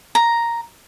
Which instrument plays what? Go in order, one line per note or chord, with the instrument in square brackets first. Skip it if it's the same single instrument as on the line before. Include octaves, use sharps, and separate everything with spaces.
[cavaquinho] A#5